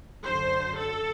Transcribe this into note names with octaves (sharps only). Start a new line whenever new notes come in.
F#2 D3 C5
A4